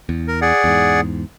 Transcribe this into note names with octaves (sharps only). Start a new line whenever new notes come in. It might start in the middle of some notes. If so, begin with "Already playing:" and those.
E2
A#4
G#4 D5 F#5
E2 G#2